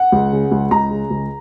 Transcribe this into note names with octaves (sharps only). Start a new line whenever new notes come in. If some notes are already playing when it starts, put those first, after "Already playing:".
Already playing: F#5
C#2
C#3
C#2
C#2 A#5
C#3
C#2